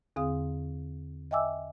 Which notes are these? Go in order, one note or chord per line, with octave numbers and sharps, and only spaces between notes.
E2 D3 C4 G#4 F5 D#6
D#5 E5 G5 G#5 D6 E6